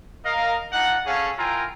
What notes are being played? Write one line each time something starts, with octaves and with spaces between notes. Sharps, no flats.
A#4 D#5 F5
D4 D#4 F4 F#5
C#4 G#4 A4 C#5 F5
E4 F4 A#4 G5 G#5 A#5